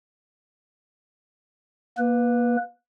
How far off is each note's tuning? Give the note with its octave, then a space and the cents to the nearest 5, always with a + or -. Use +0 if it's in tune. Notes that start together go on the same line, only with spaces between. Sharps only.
A#3 +30 B4 +0